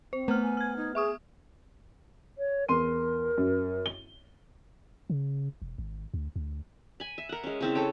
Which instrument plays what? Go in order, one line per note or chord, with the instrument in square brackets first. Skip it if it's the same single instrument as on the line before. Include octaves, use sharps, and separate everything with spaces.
[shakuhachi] C4 [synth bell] C5
[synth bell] A3 F6 [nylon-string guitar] B3
[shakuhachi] G#5
[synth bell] F6 G#6
[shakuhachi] D#4
[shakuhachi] G#4 [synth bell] E5 C#6 D#6
[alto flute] C#5
[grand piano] E2 C6 D#7 [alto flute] A#4
[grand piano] F#2
G7
[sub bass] C#3
E1
G#1
D2
D2
[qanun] G#5 B5
E5
A#4 F#5
G#3 C#4
C#3 C4 E4
A4 C#5 G5